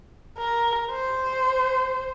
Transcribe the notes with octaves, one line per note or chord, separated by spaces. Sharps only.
A#4
C5